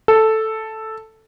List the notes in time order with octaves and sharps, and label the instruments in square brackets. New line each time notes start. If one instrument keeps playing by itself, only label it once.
[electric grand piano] A4